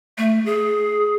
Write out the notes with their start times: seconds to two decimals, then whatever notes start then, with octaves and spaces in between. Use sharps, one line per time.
0.18 A3
0.46 G#4